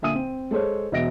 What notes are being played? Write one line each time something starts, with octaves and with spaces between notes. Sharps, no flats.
A#2 D3 E5 G#5 D#6 D#7
C4
G#3 A4 C5 C#5
E1 B2 D#5 E5 A#6 D7